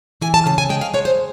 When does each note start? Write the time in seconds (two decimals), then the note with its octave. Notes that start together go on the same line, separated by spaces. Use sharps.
0.21 E3 G#5
0.34 A5
0.46 C#3 A5
0.58 G#5
0.69 G#3 G5
0.81 F5
0.94 G#3 C#5
1.05 C5